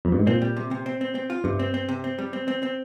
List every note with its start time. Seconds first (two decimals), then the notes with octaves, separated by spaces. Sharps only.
0.05 F2
0.12 G2
0.19 G#2
0.27 A#2 C4
0.41 G3
0.57 C3
0.71 C3
0.86 C4
1.01 C4
1.15 C4
1.30 F4
1.44 G2 C3
1.59 C4
1.74 C4
1.89 C3
2.04 C4
2.19 G3
2.33 C4
2.48 C4
2.63 C4